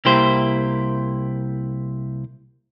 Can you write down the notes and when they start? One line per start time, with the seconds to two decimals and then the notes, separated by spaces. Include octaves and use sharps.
0.05 C2 A#3 E4 G4 C5